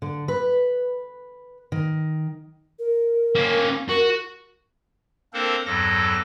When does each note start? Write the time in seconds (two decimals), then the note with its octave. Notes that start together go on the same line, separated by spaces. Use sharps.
0.02 D3
0.28 B4
1.72 D#3
2.79 A#4
3.35 A#3 C#4
3.89 F#4 A#4
5.33 A#3 C4 D4 A4 A#4 C5
5.66 E2 G2 F#3 A4 A#6